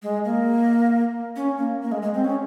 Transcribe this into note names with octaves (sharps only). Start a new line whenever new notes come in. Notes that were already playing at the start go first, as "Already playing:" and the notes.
G#3
A#3
C#4
A#3
A#3
G#3
G#3
C4
C#4